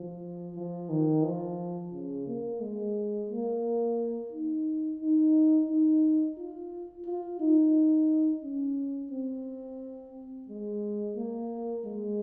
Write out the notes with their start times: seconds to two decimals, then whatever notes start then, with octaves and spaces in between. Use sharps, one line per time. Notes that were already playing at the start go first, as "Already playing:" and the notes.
Already playing: F3
0.55 F3
0.90 D#3
1.24 F3
1.93 C#3
2.27 A#3
2.61 G#3
3.30 A#3
4.32 D#4
5.00 D#4
5.68 D#4
6.37 F4
7.06 F4
7.40 D#4
8.43 C#4
9.11 C4
10.48 G#3
11.16 A#3
11.85 G#3